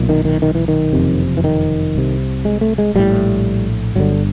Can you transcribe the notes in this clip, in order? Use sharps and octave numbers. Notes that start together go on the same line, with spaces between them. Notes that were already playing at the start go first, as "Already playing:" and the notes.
Already playing: B1 A#2
D#3
D#3
D#3
E3
D#3
F#1 F2 C3
E3
D#3
C2 C3
G#3
A3
G#3
A#1 A2 G3
G1 G2 D3 F#3